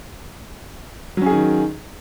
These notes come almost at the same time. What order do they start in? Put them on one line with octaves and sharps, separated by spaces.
F#3 C#4 G#4 D#3